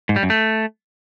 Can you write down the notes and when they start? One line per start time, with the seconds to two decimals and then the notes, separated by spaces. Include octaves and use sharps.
0.09 G#2
0.16 G3
0.23 F#2
0.30 A3